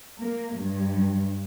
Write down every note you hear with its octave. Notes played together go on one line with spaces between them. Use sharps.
A#3
G2